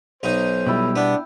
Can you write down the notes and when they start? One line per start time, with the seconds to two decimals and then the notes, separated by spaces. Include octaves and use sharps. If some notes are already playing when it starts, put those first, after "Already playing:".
0.23 B1 D#4 C5
0.66 B2 G3 E4 G5
0.96 B3 D4